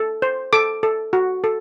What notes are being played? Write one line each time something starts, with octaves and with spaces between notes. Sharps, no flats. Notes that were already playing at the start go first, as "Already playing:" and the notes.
Already playing: A4
C5
A4 D6
A4
F#4
A4